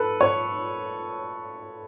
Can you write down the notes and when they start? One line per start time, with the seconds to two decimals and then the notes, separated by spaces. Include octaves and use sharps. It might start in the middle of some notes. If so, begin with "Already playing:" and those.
Already playing: A4 B4
0.21 C#5